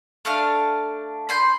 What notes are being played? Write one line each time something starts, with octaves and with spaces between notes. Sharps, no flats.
A3 D4 F5 F6
B5 C6 G6